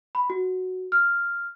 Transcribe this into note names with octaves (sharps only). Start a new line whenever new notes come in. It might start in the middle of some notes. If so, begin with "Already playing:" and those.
B5
F#4
F6